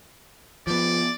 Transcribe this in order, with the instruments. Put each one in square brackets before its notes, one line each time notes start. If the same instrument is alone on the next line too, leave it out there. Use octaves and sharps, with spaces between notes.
[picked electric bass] F3 B3 [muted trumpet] D5